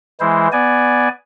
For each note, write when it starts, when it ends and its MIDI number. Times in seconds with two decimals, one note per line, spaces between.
0.20 0.48 52
0.20 0.48 56
0.20 0.48 64
0.20 0.48 72
0.52 1.09 59
0.52 1.09 74
0.52 1.09 80